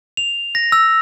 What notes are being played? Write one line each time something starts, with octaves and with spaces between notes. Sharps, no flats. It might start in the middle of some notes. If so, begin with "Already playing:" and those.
F7
A#6
E6